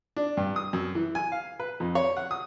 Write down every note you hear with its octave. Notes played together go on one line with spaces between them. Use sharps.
D4
G2
D#6
F#2
E3
G#5
F5
B4
F2
C#5
F#5
D#6